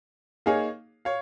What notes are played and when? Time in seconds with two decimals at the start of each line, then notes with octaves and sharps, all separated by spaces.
0.46 A#3 D#4 G#4 C#5 F5
1.05 C#5 F5